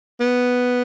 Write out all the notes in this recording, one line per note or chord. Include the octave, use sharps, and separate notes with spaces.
B3